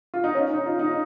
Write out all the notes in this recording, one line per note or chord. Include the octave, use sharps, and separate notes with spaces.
F4
D#4
C#4
D#4
F4
D#4